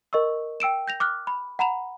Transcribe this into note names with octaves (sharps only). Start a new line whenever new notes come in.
A#4 D#5 C#6 E6
G5 E6 D7 E7
G6 A#6 F7
D6 F6 F#6
B5
F#5 A#5 B5 E7 F7